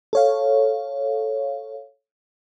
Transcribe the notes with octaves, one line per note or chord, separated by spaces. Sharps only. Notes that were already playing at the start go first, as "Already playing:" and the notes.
A4 C#5 F5